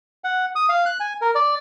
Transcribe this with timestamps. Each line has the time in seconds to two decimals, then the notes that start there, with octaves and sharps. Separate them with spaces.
0.24 F#5
0.55 D#6
0.69 F5
0.86 F#6
1.00 G#5
1.21 A#4
1.35 D5